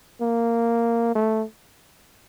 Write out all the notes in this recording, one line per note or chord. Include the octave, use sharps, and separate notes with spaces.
A#3
A3